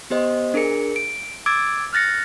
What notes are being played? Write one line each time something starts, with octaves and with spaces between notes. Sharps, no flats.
B3 G4 C5 D#5
D4 G#4 A#4 C#7
D7
D6 E6 G#6 A6 D7
F6 F#6 A6 A#6 C#7